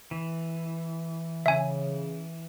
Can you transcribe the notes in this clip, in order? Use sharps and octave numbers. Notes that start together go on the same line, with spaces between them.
E3
C#3 E5 G#5